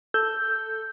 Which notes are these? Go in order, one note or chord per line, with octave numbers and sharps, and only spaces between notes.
A4 E6 G6